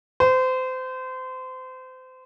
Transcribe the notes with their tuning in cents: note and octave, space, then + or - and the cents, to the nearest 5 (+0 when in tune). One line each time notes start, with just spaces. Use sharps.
C5 -30